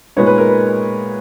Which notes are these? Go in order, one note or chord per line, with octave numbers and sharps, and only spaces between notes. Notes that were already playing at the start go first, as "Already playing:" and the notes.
A#2 G#3 B3 D#4 C#5
B4
A#4
B4